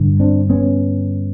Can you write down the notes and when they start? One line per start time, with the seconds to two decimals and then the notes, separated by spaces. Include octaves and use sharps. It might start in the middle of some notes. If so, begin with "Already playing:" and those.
Already playing: G2 D3
0.20 C4 D4
0.50 B3 C#4